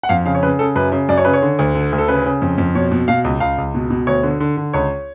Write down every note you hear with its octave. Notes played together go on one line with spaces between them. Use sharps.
F#5
F2 F5
C#3 F5
C#5
C#3 B4
C#3 A4
F#2 B4
C#3
F#2 D5
C#5
C#3 B4
C#5
D3
D2
D3
D2
A4
C#3 B4
C#3
F2
F2
B2 C#5
B2
B2 F5
C#2
C#2 F5
C#2
B2
B2
D2 C#5
D3
D3
D3
C#2 C#5